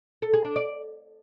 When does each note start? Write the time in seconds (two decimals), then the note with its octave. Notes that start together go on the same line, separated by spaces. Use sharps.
0.22 A4
0.33 G#4
0.45 D4
0.56 D5